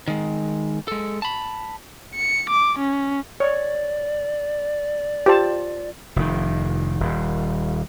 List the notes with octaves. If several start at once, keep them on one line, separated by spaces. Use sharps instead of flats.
D#3 G#3
G#3 A4
A5 B5
C#7
D6
C#4
C#5 D5
F4 G4 C5 A5
F1 D#3
D#1